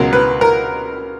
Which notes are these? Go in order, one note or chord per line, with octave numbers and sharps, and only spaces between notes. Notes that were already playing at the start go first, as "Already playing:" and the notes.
Already playing: C#2 B2 F#3 A#4
B4
A#4